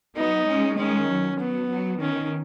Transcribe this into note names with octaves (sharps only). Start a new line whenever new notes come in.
F#3 B3 D#4
G#3 C#4
D#3 G#3 C#4
F#3
F#3 B3
F#3
D#3 C#4